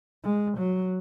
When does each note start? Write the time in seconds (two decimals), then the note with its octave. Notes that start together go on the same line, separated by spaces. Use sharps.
0.24 G#3
0.58 F#3